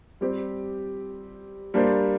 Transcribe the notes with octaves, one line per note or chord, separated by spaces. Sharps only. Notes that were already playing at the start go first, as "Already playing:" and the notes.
G3 C4 G4
G3 A#3 D4 G4 C5